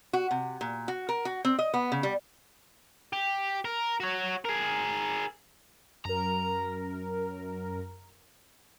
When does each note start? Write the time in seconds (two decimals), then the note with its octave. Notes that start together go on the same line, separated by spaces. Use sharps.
0.13 F#4
0.31 C3
0.61 A#2
0.88 F#4
1.09 A#4
1.25 F#4
1.45 C4
1.59 D#5
1.74 B3
1.92 C#3
2.03 G3
3.13 G4
3.65 A#4
4.00 F#4 C#5
4.45 G#4 A#4
6.05 F#2 A#4 A#5